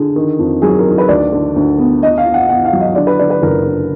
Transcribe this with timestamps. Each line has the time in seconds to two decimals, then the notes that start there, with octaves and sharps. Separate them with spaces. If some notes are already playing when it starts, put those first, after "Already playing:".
Already playing: D3 G#4
0.16 D#3
0.39 F2
0.62 F#3 G#4
0.79 A#4
0.85 D#3
0.98 B4
1.08 D2 D5
1.33 D3
1.56 D2
1.79 B3
2.03 B3 D#5
2.18 F5
2.26 B3
2.34 F#5
2.49 B3 F#5
2.65 F5
2.73 F#3
2.80 D#5
2.95 D3 D5
3.07 B4
3.19 D3 D5
3.30 B4
3.42 F#1 A#4
3.66 D3